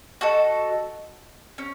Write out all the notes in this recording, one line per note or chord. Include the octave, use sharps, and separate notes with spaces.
F#4 A4 D#5
C#4